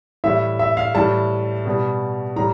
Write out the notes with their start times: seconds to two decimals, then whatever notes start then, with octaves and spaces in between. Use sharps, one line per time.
0.24 A2 E3 G3 E5
0.59 E5
0.77 F5
0.95 A2 E3 G3 A5
1.65 B2 G3
2.36 A2 E3 G3 A#5